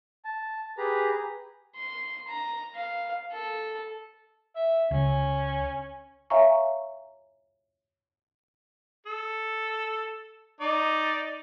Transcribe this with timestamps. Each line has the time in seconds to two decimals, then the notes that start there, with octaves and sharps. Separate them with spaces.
0.25 A5
0.78 G4 G#4 B4 A#5
1.77 C6
2.28 A#5
2.75 F5
3.32 A4
4.56 E5
4.91 C#2 C#4
6.30 C#5 E5 F5 G#5 A#5 C#6
9.06 A4
10.61 D#4 D5